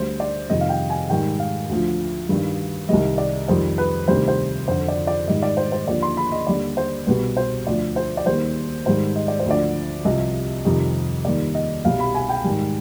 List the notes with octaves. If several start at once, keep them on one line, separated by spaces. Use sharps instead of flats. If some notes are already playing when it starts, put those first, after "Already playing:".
Already playing: D2 D3 G3 C5
D5
F2 C3 D#3 G3 D#5
F5
G5
G#5
G#2 D#3 G3 G5
F5
D2 D3 F3
G2 D#3 G3
C2 C3 D#3 G3 D#5
D5
F2 D#3 G3 C5
B4
D2 C3 D#3 G3 C5
C5
F2 D3 F3 C5
D5
D5
G#2 D#3 G3 D#5
D5
C5
C5
D#2 D3 F3 D5
C6
B5
D#5
D#2 D3 G3 D5
C5
C2 B2 G3 B4
C5
D2 D3 F3 D5
C5
D5
D#2 D#3 G3 C5
G#2 D#3 G3 C5
D#5
D5
C5
D2 D3 F3 D5
C2 C3 F3 D#5
F2 C3 D#3 G3
D#2 D#3 G3 D5
D#5
C2 B2 G3 F5
B5
G#5
G5
G#2 D#3 G3